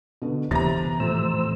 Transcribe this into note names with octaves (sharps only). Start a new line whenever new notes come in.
B2 D3
C3 E3 B3 A#5 A6 A#6
F2 A2 C5 E6